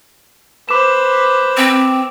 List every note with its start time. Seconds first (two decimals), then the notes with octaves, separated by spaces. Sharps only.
0.69 B4 C5 D6 E7
1.57 C4